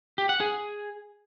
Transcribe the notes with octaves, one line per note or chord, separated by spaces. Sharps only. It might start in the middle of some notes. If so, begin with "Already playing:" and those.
G4
F#5
G#4